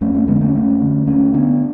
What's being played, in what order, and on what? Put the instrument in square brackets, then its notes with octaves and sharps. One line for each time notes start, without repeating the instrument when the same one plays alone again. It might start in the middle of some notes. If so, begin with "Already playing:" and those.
[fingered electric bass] F2 A3 C#4
A3 C#4
D3 G#3 B3
D4
A3 C#4
F2 A3 C#4
D3
D2 A3 C#4
D3 B3 D4